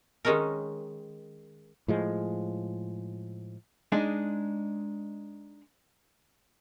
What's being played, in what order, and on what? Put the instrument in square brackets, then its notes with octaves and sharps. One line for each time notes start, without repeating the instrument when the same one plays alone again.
[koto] D#3 G#3 C#4 D#4 A#4
[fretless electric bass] A2 F3 G#3
[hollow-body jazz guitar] G#3 D4 D#4